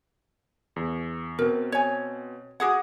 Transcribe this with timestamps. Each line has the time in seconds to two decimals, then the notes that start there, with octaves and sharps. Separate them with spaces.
0.76 E2
1.39 B2 C4 A#4
1.72 C#5 G#5
2.60 F#4 G#4 F#5 D6 D#6 G#6